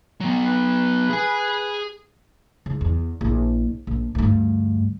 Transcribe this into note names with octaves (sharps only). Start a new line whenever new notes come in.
F#3 B3
B4
G#4 G#5
C#2
E2
A#1 E4
A#1
D2 G2